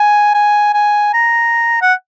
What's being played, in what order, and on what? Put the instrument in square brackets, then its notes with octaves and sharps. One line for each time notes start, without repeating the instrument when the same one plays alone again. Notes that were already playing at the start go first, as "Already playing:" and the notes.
Already playing: [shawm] G#5
G#5
G#5
A#5
F#5